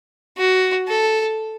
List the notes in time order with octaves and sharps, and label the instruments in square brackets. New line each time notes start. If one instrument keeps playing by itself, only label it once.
[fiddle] F#4
A4